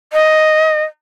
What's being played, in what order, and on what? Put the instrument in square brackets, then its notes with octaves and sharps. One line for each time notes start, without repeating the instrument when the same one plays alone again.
[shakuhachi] D#5